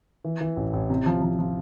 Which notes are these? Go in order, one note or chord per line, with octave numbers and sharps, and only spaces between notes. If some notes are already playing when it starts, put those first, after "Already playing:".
E3
E3
A1
A1
C3
F3
F3
F3